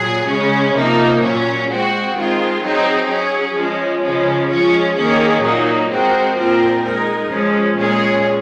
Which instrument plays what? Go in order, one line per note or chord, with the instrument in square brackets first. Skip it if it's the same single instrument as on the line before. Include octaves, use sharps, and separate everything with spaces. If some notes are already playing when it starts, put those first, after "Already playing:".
Already playing: [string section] A#2 F#3 G#4
C#3 G#3 C#4
C3 F3 A#3 D#4
A#2 F#3 C#4
G#3 C4 F#4
D#3 G#3 C4 F4
F#3 C4 D#4 G#4
F#3 C#4 G#4
F3 G#3 C#4
C#3 F3 G#3 C#4
F3 G#3 C#4 F4
D#3 A#3 C#4 G#4
A#2 F#3 A#3 D#4
G#3 C4 F#4 A#4
A#2 F3 C4 F4 A#4
G#3 D#4 A#4
F3 G#3 C#4
A#2 G#3 C#4 G#4